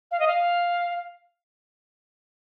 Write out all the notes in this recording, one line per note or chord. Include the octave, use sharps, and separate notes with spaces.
F5
D#5
F5